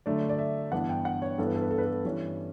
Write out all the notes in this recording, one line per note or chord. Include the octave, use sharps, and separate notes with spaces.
D3 F#3 A3 D5
D5
E5
G2 E3 B3 D4 F#5
G5
F#5
C#5
G2 E3 B3 D4 A4
B4
A4
B4
A4
B4
A4
G2 E3 G3 C#4